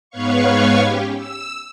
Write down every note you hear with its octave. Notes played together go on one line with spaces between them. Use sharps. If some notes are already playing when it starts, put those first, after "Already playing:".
G#2 B3 B4 C#5 F5 C#6
C#4 G4
E6